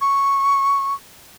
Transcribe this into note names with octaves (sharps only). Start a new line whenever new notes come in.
C#6